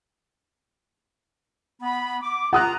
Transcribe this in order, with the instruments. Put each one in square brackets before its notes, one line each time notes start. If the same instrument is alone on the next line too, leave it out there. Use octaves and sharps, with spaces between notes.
[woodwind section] B3 B5
D6
[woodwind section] F4 A#5 [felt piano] F#5 D#6 F#6